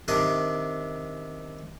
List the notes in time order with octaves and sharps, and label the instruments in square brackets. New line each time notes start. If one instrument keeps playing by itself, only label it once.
[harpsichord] C3 D#3 D4 D5 C6 D#6